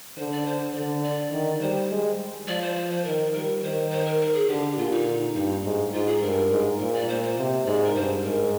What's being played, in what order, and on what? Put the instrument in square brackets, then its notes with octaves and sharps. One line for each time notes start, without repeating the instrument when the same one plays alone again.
[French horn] D3 [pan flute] C5
[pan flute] D5
C5
[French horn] D3 [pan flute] D5
[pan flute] D5
[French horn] D#3
[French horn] G3 [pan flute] C5
[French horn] G#3
[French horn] F3 [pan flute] D5
[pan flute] C5
C5
C5
[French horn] D#3 [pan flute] A#4
[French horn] G3 [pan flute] A#4
[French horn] D#3 [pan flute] C5
[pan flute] C5
A#4
A#4
G#4
[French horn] D3 [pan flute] G4
[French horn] A#2 [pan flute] F4
[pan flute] D#4
[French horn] G2 [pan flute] D#4
[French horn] G#2
[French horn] G#2 [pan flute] F4
[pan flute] G#4
[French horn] G2 [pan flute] A#4
[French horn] G#2
[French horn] A#2 [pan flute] A#4
[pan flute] D5
[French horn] A#2 [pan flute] C5
[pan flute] C5
[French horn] C3
[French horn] G#2 [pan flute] D5
[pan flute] A#4
[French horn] G2 [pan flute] C5
[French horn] G#2 [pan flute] A#4